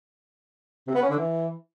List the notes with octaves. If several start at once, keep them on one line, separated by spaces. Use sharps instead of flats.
C3
B3
C#4
D3
E3